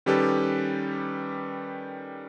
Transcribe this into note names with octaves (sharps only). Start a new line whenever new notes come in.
D#3 G3 C#4 G4 A4 B4